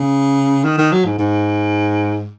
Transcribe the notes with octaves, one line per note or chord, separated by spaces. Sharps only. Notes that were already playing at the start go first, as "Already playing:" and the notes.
Already playing: C#3
D#3
D#3
F#3
G#2
G#2